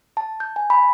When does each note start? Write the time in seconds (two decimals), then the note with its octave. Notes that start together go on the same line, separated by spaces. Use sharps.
0.17 A5
0.40 G6
0.56 G#5
0.70 B5